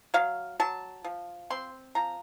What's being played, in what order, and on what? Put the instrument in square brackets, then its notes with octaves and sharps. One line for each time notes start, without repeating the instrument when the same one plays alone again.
[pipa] F#3 F5
F#3 A5
F3
C4 C6
F3 A#5